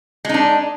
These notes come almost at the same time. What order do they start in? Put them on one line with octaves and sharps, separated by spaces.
G#3 D#4 D4